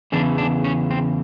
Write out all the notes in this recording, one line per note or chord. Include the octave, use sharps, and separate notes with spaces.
E2 C#3 E3 D4
D4
C#4
C4